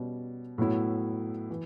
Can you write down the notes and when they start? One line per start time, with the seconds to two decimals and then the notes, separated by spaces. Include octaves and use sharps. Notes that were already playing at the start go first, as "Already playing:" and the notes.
Already playing: B2 G3 C#4
0.58 A2 F#3 B3 E4
1.50 E3